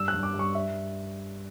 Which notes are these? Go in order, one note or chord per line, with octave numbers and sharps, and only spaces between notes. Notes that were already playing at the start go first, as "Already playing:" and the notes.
Already playing: G2 E6
F#6
G2
D6
G2
C#6
E5